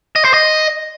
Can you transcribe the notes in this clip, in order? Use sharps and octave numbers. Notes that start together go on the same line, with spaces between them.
D#5
C5
D#5